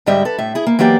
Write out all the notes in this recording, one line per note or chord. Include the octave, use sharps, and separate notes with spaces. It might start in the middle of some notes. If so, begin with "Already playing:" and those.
G#2 D3 G3 G4 D#5 E5
A4 B4
A2 E5
E4 G#4
A#3
E3 F#3 A#3 G4 D5